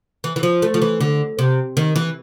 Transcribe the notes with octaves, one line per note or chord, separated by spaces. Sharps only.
E3
E3
F3
A3
F3
E3
D3
C3
D#3
E3